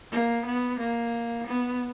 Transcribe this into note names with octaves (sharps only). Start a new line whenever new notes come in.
A#3
B3
A#3
B3